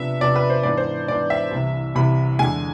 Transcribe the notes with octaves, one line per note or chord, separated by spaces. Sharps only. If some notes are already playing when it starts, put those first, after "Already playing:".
Already playing: C3 F3 B3 D4 E5
C3 F3 B3 D4 D5
B4
C5
G#2 E3 B3 D4 D5
C5
G#2 E3 B3 D4 D5
E5
C2 C3 E3
C2 C3 E3 B5
E2 D3 G#3 G#5